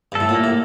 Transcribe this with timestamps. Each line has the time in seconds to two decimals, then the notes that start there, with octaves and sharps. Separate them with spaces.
0.12 G2 A4
0.20 A2
0.29 A#2
0.34 A#3
0.44 A2